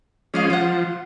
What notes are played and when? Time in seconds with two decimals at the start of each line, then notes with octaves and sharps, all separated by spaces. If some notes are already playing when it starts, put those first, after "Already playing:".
0.34 F3 G#3 C#4 D5 D#5 F5
0.50 F3 F4 F#5